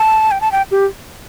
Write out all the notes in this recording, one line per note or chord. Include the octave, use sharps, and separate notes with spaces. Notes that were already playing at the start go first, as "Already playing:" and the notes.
Already playing: A5
G5
A5
G5
G4